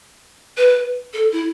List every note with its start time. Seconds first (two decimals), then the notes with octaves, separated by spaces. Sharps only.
0.57 B4
1.14 A4
1.33 E4